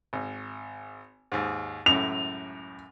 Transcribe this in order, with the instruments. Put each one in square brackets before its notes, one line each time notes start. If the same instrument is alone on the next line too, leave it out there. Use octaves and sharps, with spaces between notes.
[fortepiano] G#1
D#2 G#2
[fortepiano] C#2 F#2 A2 [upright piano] F7